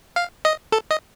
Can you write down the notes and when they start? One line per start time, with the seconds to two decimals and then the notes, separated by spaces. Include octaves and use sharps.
0.16 F5
0.45 D#5
0.72 A4
0.91 D#5